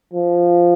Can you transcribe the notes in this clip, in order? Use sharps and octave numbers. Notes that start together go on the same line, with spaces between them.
F3